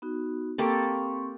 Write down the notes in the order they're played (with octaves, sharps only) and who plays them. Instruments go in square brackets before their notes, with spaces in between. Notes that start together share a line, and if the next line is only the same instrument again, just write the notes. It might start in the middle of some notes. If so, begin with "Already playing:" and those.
[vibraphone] B3 D#4 F#4
[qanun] A#3 G4 A4 [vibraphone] C4 C6 C#6